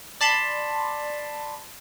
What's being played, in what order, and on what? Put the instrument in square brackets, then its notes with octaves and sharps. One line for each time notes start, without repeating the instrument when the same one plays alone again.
[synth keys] D5 A5 B5 C6